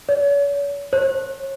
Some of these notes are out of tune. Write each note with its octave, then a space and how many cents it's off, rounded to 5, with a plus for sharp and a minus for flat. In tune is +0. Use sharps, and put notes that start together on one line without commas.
C#5 +40
C#5 -40